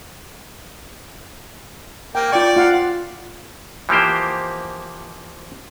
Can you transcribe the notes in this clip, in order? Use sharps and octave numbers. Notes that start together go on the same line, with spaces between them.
A#3 G5
F4 D5 G5 C#6
F4 F5 F#5
E3 F3 A#3 G4 C5